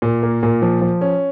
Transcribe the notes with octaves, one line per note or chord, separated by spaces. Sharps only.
A#2
A#3
A#2
F3
F3
C#4